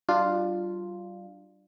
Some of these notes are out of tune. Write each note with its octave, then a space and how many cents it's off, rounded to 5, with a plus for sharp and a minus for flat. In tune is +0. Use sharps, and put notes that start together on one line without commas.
G3 -45 D4 +20 F4 +0